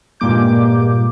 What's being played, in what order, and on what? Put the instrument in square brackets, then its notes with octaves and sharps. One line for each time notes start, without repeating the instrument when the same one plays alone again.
[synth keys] G2 A#2 G#3 A#3 D6 G6